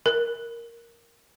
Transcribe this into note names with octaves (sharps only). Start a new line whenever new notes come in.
A#4